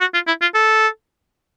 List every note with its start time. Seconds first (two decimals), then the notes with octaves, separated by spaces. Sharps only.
0.01 F#4
0.14 F4
0.28 E4
0.42 F4
0.55 A4